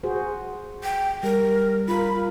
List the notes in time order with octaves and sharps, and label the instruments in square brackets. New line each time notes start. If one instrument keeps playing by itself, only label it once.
[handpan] F#4 G#4 C5
[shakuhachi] G5
[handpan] G3 [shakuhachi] A#4
[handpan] F4 A#4 [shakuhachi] B5